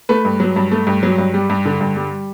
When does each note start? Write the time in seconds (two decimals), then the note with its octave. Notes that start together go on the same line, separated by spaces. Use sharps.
0.09 A3 B4
0.25 G2
0.40 F#3
0.56 G2
0.71 A3
0.87 G2
1.03 F#3
1.18 G2
1.34 G3
1.50 G2
1.65 D3
1.81 G2
1.96 G3